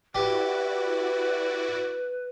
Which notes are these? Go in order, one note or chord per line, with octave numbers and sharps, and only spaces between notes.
E4 F#4 G4 B4 D5